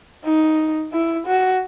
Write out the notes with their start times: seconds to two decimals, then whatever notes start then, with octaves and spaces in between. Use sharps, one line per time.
0.24 D#4
0.92 E4
1.27 F#4